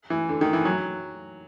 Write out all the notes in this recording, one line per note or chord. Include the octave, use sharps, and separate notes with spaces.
E3
D3
D#3
E3
F#3